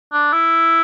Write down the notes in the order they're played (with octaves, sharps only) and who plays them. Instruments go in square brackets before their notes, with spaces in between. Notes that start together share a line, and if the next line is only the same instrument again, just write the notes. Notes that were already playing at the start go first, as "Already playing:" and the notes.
[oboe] D4
E4